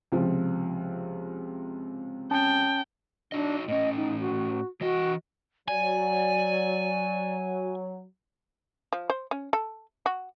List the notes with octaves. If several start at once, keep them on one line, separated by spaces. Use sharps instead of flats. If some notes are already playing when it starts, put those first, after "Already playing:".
C#2 C3 F3
C#4 G5 A5
D4 D#4 F#4 D#5
A2 C#4 D#5
D#4
F#4
E3 F#4 D#5
F#3 D5 G#5
F3
C5
C#4
A4
F#4